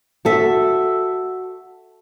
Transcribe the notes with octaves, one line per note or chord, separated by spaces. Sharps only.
F#4 A4 E5